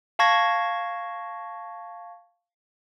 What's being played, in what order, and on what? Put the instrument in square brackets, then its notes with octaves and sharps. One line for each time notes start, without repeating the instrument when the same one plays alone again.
[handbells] F5 A5 C#6 G#6 A#6